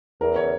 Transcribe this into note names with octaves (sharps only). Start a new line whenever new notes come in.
E2 A#4
C#5